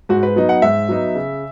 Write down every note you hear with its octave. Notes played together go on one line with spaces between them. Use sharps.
G#2 F#4
B4
F#3 B3 D#4
F#5
G#2 E5
F#3 B3 D#4
C#3